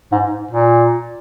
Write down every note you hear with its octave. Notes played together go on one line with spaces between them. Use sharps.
G#2
A#2